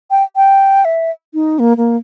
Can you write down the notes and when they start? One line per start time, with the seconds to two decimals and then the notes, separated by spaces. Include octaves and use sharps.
0.11 G5
0.36 G5
0.85 E5
1.34 D#4
1.59 A#3
1.77 A#3